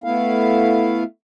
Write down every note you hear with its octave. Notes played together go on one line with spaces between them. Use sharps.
A3 B3 E4 F5